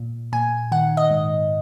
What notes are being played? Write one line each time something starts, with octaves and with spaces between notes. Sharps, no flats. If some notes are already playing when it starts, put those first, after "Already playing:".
Already playing: A#2
A#2 G#5
D#3 F#5
D#5
G#2